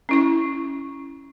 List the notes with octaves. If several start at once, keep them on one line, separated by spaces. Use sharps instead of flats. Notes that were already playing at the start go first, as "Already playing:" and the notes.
C#4 E4 C#6